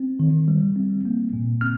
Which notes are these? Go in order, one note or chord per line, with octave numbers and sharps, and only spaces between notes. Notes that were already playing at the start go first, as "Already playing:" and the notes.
Already playing: C4
D#3
G3
C4
A#3
A#2
C4 F6